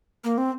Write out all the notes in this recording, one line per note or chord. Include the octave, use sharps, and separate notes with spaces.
A#3
C4